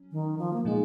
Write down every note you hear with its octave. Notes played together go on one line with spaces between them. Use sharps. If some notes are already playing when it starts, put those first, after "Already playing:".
Already playing: F#3 C#4
D#3
F3
A#3
A#2 F3 G#3 A#3 D#4